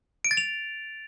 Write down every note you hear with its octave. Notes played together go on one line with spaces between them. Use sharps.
D7
A6
F7